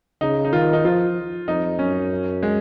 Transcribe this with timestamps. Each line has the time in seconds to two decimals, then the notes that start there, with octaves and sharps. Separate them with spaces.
0.21 C#3 D#4
0.45 D#4
0.53 D#3 F4
0.73 D#4
0.85 F3 F4
1.48 F2 D#4
1.79 F#2 C#4
2.43 G#3